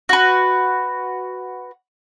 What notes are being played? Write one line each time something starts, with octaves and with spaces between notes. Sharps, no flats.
F#4 B4